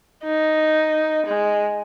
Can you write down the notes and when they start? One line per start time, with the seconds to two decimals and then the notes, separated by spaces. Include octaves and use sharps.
0.24 D#4
1.26 G#3